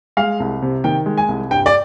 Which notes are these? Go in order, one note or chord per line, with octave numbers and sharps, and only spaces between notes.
G#3 F5
C2
C3
D#3 G5
G#3
G#5
C2
G2 G5
D5